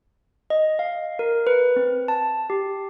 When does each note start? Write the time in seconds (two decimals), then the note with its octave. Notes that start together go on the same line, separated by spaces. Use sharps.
0.50 D#5
0.79 F5
1.19 A#4
1.47 B4
1.76 C4
2.08 A5
2.50 G4